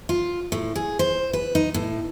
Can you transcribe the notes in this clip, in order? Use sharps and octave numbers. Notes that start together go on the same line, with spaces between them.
F4
A2
G#4
C5
B4
D#4
A2